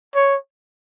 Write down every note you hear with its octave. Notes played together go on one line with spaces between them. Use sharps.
C#5